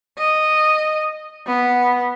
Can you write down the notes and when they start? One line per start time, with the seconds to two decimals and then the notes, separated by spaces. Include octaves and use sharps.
0.18 D#5
1.47 B3